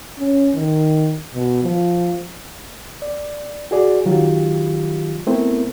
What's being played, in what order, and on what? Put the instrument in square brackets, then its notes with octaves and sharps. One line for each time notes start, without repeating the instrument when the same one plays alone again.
[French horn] C#4
D#3
B2
F3
[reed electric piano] D5
F#4 G#4 D5
D#3 F#3 F4 G4
A3 B3 C4 E4 A#4